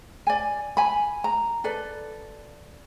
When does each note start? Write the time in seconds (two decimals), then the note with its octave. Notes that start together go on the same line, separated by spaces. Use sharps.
0.27 D5 G#5
0.77 G#5 B5
1.24 A#5
1.64 A4 B4 D5